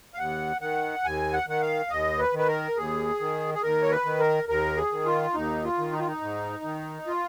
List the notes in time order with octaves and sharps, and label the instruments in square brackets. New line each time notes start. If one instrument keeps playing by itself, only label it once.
[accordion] F5
D#2 F#5
D#3 F#5
D#2 G#5
F#5
D#3 F#5
F5
D#2 D#5
B4
D#3
B4
A#4
D#2 G#4
D#3
G#4
D#2 A#4
C#5
B4
D#3
A#4
D#2 A#4
G#4
D#3
F4
D#2 D#4
F4
D#3
D#4
F4
D#4
G#2
D#3
F4